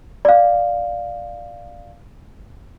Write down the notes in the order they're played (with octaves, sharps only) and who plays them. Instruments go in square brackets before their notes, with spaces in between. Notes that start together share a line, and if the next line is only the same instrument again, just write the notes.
[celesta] D5 F5